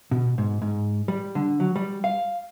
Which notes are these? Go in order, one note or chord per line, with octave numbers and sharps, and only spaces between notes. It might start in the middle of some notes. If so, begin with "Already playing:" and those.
B2
G#2
G#2
G3
D3
F#3
G3
F5